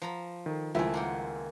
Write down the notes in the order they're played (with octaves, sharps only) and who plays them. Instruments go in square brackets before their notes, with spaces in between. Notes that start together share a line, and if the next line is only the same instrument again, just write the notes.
[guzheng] F3 A#5 B5
[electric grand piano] D#3 A4
[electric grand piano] C#2 G#5 [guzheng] D#3 A3 [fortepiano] F3 E4
[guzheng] A#3 F#5 G5